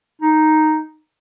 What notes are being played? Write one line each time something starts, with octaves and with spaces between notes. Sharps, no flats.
D#4